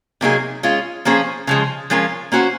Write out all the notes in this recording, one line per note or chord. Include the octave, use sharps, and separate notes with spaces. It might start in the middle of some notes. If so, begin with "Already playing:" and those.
C3 F#3 A#3 D#4 G#4
G#3 C#4 F4
F3 A#3 C#4 G#4 C5
C#3 F3 G#3
F3 G#3 C#4 F4 A#4
A#3 C#4 F#4 C5